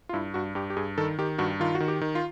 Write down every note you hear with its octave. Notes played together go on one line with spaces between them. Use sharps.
F4
G2 E4
G2 F#4
G2 G4
G4
G2 G#4
D#3 A4
D#3 G4
G2 F#4
D#3 F4
F#4
D#3
G4
D#3
F4